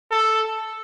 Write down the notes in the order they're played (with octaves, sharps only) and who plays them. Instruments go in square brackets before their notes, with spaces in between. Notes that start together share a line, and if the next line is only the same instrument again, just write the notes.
[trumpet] A4